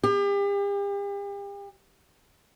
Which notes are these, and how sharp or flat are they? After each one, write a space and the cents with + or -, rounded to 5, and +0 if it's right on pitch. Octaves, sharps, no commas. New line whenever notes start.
G4 +40